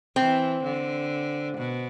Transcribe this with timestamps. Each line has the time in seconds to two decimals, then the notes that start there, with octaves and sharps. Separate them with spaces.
0.16 E3 C4
0.63 D3
1.58 B2